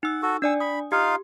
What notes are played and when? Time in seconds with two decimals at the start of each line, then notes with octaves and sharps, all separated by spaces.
0.03 D#4 F#5 E6
0.22 F#4 A4
0.42 D4 D5 G#5 E6
0.60 B5 D#6
0.92 D#4 F4 G4 F5